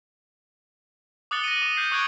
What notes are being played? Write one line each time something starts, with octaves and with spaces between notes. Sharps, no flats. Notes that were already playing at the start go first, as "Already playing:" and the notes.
D6 D#6 F#6 A6 C#7 G7
A#6 D#7
D6
F#6 G6 C7
C#6 D#6 F#6 G#6 C#7 D7